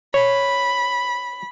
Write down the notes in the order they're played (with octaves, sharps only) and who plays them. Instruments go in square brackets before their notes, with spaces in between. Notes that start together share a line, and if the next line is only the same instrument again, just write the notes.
[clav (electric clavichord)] C#5 [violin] B5